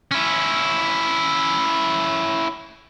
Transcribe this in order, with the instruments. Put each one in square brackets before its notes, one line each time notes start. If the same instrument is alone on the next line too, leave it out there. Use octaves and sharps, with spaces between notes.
[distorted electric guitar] C#4 E4